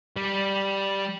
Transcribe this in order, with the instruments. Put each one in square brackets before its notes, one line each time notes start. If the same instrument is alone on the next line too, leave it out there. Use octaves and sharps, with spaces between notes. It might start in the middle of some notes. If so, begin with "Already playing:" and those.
[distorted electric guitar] G3